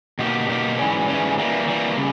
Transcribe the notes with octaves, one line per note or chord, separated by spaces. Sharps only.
B2 A#3 D#4 G4
B2 A#3 D#4 G4
G#2 E3 G3 C#4
G#2 E3 G3 C#4
E3 G3 A#3
E3 G3 A#3
C#3 G3